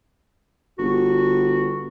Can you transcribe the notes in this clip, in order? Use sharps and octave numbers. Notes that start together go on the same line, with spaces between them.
G1 F#4